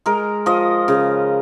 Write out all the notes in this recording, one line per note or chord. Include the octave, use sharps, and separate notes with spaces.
G#3 A#4
F3 D#5
C#3